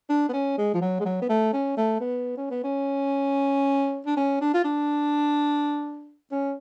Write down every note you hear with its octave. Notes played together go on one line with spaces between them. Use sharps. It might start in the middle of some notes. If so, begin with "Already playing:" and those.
D4
B3
C#4
G#3
F3
F#3
G#3
F#3
B3
A3
C#4
A3
B3
C#4
B3
C#4
D4
C#4
D4
F4
D4
C#4